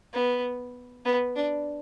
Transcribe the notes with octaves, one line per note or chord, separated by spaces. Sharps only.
B3
B3
D4